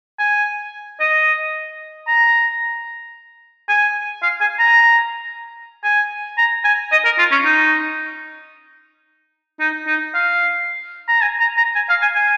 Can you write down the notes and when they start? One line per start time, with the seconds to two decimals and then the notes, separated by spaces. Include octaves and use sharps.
0.19 G#5
1.00 D#5
2.08 A#5
3.69 G#5
4.23 F5
4.41 G#5
4.59 A#5
5.84 G#5
6.38 A#5
6.64 G#5
6.92 D#5
7.05 A#4
7.19 F4
7.31 C#4
7.45 D#4
9.60 D#4
9.87 D#4
10.14 F5
11.08 A#5
11.22 G#5
11.40 A#5
11.57 A#5
11.76 G#5
11.89 F5
12.02 G#5
12.16 G#5